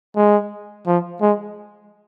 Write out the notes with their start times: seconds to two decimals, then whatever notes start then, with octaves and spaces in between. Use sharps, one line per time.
0.16 G#3
0.87 F3
1.22 G#3